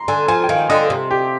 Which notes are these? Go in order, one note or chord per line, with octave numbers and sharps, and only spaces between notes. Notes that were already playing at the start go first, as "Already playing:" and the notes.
Already playing: A#5 C6
D3 G#5
F3 G#5
G5
D#3 F5
D3 D#5
C3
G4